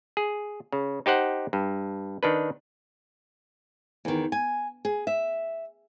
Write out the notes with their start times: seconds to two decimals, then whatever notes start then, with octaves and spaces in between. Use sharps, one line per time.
0.17 G#4
0.72 C#3
1.06 D#4 G4 C5 F#5
1.53 G2
2.23 D#3 D4 B4
4.05 E2 D#3
4.32 G#5
4.85 G#4
5.07 E5